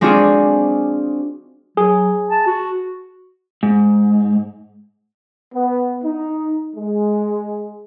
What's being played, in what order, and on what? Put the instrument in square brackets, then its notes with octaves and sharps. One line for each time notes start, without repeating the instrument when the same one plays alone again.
[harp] G#3 C4 D4 F4 F#4 G#4
[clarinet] F#3 [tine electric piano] G#4
[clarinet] A5
F#4
[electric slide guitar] G#2
[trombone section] B3
D#4
G#3